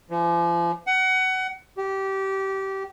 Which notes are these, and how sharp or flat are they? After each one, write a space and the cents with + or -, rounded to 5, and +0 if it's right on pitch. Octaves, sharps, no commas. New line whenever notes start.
F3 -40
F#5 +25
G4 -20